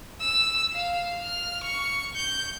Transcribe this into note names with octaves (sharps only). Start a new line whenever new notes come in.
E6
F5
F6
C#6
G6